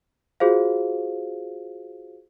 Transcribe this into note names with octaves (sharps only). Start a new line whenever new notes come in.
F4 F#4 G#4 C5 F5